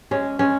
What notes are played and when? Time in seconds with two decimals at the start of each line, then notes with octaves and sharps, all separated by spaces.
0.11 G#3 C#4
0.39 G#3 C#4